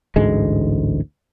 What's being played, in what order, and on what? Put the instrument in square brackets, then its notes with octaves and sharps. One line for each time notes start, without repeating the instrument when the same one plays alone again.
[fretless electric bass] A1 D2 G#2 G#3